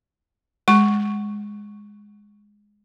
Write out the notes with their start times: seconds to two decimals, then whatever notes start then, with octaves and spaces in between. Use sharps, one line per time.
0.68 G#3 C#6